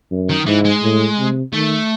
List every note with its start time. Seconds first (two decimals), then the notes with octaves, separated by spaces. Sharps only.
0.11 F#2
0.30 D#3
0.46 G#2 E3
0.65 G#3
0.83 A2
1.18 C3
1.53 D#3 A3